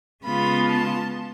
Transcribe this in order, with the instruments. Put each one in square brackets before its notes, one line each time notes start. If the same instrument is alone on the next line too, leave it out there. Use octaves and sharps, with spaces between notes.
[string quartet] C#3 G#3 B3 F4 B5
A5